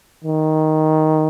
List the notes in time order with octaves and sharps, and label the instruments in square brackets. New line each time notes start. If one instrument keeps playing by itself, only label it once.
[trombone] D#3